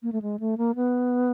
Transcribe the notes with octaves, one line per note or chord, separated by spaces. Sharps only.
A#3
A3
G#3
A3
A#3
B3